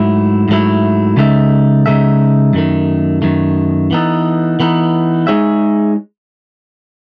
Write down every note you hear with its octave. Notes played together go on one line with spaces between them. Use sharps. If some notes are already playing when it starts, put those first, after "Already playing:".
Already playing: G#2 F#3 A3 E4
G#2 F#3 A3 E4
C#3 G#3 D#4 A4 E5
C#3 G#3 D#4 A4 E5
F#2 D#3 A3
F#2 D#3 A3
E3 B3 D#4 A4
E3 B3 D#4 A4
G#3 D#4 G#4 C#5 E5